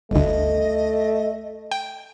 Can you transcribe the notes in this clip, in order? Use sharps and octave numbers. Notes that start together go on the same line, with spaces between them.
G1 D2 A3 D#5
G5